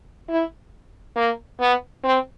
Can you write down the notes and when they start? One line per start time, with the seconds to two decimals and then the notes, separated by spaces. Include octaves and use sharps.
0.29 E4
1.16 A#3
1.60 B3
2.04 C4